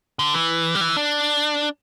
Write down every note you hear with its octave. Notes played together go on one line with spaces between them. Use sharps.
D3
E3
G3
E3
D4